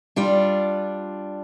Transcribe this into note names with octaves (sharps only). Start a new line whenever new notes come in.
G3 D4 F4